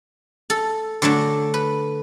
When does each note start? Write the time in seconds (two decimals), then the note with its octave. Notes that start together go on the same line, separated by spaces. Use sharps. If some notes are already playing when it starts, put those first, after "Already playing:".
0.50 A4
1.02 D3 F#3 A3 D4
1.54 B4